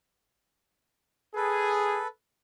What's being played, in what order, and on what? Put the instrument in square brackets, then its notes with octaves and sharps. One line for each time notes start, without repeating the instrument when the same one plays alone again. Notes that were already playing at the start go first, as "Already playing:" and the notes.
[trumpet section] G#4 [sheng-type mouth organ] A4 B4